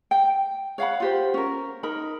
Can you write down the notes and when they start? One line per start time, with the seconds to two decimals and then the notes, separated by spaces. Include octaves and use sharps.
0.11 G5
0.78 C#5 F5 F#5 B5
1.00 F4 G4 C5
1.34 C#4 A#4
1.83 D#4 A#4 B5